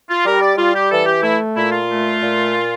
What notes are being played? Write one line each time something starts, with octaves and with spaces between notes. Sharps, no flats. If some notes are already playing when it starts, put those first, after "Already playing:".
F4
G3 A#4
D5
G3 F4
G4
E3 A4
G4
A3 E4
A#2 E4
F4
A3
A#2